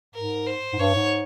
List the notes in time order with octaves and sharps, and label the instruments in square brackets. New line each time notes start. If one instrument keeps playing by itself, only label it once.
[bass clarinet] G#2 [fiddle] A#4
[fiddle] C5
[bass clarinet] G#2
[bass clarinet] G2 [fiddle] C#5
[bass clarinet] G#2